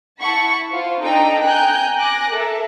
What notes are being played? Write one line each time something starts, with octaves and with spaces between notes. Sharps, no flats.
E4 F#5 A5 B5 C#6
F4 C5
D4 D#4 A4 D#5 G5 A#5
G5 G#5 A#5 F#6 G6
G#5 D6 F#6 A#6 D7
A4 A#4 E5